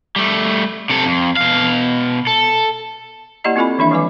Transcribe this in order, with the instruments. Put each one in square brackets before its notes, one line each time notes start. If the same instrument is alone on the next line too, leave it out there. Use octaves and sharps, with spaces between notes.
[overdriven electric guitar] G3 A3
C3 A4
F2
B2 F5
A4
[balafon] A#3 E4 G4 D5 D#5 A#5
C4 E4 F4 A4 G#5 B5
D#3 E3 A#3 D4 E4 E5
E3 F3 G#3 B4 G#5 D6